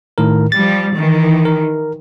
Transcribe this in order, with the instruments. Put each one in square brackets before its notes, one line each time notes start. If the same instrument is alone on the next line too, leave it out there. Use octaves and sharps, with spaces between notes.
[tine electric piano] A2 D#3 A#4
[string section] F3 G3 [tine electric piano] A6
[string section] D#3 E3
[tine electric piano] A#4